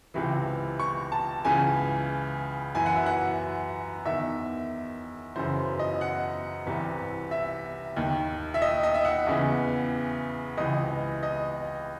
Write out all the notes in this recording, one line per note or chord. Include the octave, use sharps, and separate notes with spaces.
C#2 C3 E3
C#6
A5
C#2 C#3 E3 G#5
F#2 E3 G#5
F#5
E5
F#5
E2 D#3 E5
F#2 C#3 E3 C5
D#5
F#5
C2 C3 E3
E5
D#2 D#3
E5
D#5
D#5
E5
F#5
E2 C#3 E3
C#2 C3 E3 D#5
D#5